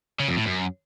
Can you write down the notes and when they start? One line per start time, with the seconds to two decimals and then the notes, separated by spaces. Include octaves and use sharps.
0.20 C#3
0.28 F2
0.37 A2
0.46 F#2